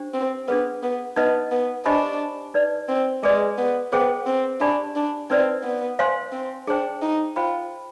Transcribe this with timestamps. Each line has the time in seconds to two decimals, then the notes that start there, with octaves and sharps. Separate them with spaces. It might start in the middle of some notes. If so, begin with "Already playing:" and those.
Already playing: D4 G4 C5
0.14 C4
0.48 B3 D4 G#4 B4
0.83 B3
1.16 B3 D#4 B4 D#5
1.51 B3
1.86 D4 G4 C5 D#5 G#5 B5
2.54 D#4 B4 D5
2.89 C4
3.23 G#3 G#4 B4 D5
3.58 B3
3.92 B3 G#4 C5 G5
4.27 C4
4.61 D4 G4 D5 G#5 B5
4.96 D4
5.30 C4 D#4 B4 D5
5.64 B3
5.99 C5 F5 G#5 C6
6.33 C4
6.67 D4 G#4 C5 G5
7.02 D#4
7.36 F4 C5 G5 B5